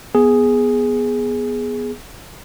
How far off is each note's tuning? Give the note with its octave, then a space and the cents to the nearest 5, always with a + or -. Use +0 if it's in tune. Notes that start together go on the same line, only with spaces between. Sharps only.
B3 -10 G#4 +0